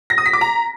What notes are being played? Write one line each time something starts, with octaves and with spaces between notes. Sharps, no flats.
A#6
D#6
B6
D6
A#5